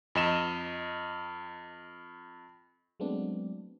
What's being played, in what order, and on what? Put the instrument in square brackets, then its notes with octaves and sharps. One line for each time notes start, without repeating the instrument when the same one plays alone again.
[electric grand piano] F2 D#5 E7
[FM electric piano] F#3 G#3 A3 B3 C4 D4